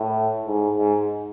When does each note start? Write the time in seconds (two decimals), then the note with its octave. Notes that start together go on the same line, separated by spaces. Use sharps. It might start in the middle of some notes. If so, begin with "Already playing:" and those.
Already playing: A2
0.47 G#2
0.77 G#2